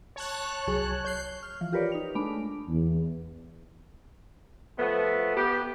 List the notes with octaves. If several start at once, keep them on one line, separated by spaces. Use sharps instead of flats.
C#5 A5 F#6
C2 F#3 G#4
C#5 F#6 G6 C7
F6
E3 F3
F4 G4 A#4 B4 C#5 D5
D#4 F7
G#3 A3 D4 B5 D7
E2
F3 A3 B3
B3 G4